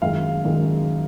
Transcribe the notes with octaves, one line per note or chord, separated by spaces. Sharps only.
F#1 F#2 D#3 G#3 F5
F#1 F#2 D#3 G#3